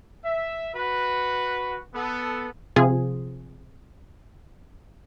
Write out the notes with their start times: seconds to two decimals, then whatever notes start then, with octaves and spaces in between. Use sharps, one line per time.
0.25 E5
0.75 F#4 B4
1.95 B3 A4
2.76 C3 F3 F4 G#4